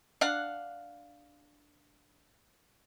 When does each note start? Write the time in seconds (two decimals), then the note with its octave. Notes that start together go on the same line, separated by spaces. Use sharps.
0.21 D4 F5 F#5